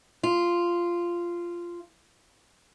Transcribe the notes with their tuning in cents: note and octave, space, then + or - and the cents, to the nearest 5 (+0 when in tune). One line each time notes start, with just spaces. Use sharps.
F4 -10